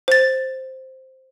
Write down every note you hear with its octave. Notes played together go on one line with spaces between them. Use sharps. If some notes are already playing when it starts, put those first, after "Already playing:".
C5 A6